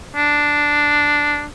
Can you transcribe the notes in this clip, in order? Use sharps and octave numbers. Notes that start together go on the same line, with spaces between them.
D4